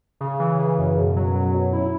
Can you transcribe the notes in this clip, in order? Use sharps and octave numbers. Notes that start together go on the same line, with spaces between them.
C#3
E3
C#3
F#2
B2
F#3
F#3
B2
E4